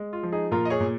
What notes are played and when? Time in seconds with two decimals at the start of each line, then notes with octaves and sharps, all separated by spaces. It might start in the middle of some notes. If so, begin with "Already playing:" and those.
Already playing: G#3
0.13 F4
0.23 F3
0.32 D#4 G#4
0.51 A#2 F4 A#4
0.65 D#5
0.70 G#4 C#5
0.80 A#2